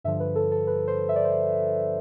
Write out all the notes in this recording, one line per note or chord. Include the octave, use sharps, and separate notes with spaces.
G2 D3 F3 E5
B4
A4
A4
B4
C5
E5
D5
C5
D5